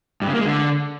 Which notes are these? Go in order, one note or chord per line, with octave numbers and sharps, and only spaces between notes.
G2
C#3
A#3
G#3
D3